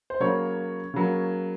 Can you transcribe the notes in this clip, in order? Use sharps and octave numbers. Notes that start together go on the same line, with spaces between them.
C5
C#3 F#3 A#3 C#5
C#3 F#3 A#3